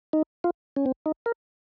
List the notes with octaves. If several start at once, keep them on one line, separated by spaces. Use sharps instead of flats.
D#4
F4
C#4
C4
D#4
A#4